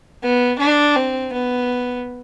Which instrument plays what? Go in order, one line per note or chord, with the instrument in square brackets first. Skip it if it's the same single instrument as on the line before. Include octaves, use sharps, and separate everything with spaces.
[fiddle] B3
D4
C4
B3